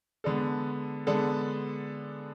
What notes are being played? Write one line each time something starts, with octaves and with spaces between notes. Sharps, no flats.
D3 G#3 B3 D4 A4
D3 G#3 B3 D4 A4